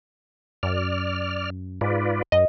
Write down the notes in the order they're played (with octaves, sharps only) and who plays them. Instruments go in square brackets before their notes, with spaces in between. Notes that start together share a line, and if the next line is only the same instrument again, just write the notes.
[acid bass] F#2 [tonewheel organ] D5 F6
[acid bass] G#2 [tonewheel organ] F4 B4 D5
[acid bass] F#2 [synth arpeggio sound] D#5